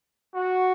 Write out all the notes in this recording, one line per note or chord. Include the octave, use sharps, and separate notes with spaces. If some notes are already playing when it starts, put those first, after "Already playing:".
F#4